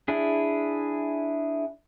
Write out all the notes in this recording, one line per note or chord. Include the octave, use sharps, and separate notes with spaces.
D4 E4 G#4